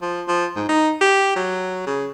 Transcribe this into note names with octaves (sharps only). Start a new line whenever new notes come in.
F3
F3
G#2
D#4
G4
F#3
C#3